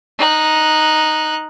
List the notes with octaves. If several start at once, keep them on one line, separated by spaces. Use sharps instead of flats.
D#4 F#6